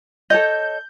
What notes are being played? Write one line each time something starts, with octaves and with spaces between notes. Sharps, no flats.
A4 C#5 D#5 G6